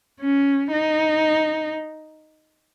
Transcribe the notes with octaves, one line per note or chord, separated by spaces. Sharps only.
C#4
D#4